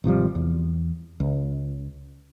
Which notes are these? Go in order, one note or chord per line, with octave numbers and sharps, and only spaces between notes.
G#1 C3 F3 G3
E2
C#2